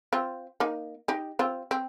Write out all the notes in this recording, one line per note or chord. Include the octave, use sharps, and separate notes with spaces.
C4 F4
A#3 D#4
D#4 G4
C4 F4
C4